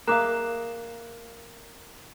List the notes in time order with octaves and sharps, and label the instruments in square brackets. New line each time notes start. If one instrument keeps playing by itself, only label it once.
[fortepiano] A#3 [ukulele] G#4 E5 F5 [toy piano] A#5 D6 [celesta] F#6 E7